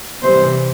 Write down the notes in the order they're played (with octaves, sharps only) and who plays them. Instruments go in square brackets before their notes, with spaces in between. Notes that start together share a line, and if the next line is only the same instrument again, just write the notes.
[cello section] C3 E3 G3 C5